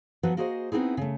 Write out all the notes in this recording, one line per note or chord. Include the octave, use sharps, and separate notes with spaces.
F3 F#3 B3 B4
A#3 F#4 G#4 C5 D#5
B3 C4 D#4 E4 G#4
C#3 A3